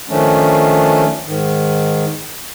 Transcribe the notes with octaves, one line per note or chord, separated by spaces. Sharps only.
D#3 F3 A3 C#4 D4
G#2 D#3